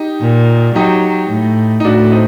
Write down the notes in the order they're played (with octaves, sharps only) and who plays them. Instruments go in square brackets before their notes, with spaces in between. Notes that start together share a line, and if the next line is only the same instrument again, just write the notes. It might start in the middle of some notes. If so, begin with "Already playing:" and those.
Already playing: [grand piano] D#4 G4
[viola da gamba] A#2
[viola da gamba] F#3 [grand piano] D#4 G4
[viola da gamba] A2
[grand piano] D#4
[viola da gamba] A2 [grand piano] D4 F#4
[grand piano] C4 D#4